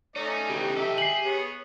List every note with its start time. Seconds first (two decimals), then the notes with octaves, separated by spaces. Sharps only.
0.16 A3 C#4 D#4 D5 D#5
0.49 C#3 E3 G4
0.76 D#4 A4 E5 G5
0.98 G#4 C7 F#7
1.25 B3 C#5